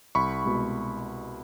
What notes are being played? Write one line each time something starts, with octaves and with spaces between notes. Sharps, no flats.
C2 B5 C#6
B2 G#3